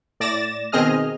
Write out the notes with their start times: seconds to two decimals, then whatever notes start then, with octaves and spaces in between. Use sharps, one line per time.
0.20 A2 D5 A6 A#6 E7
0.72 B2 D#3 C4 G#4 D#5 F6